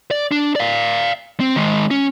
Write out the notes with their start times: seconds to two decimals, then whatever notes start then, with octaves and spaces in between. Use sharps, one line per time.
0.11 D5
0.32 D4
0.56 D5 F5
1.40 C4
1.56 D#3 G#3
1.91 C#4